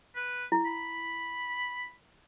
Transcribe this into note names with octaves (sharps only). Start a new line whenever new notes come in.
B4
E4
B5